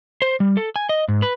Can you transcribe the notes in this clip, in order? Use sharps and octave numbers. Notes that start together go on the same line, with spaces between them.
C5
G3
A4
G#5
D#5
G#2
B4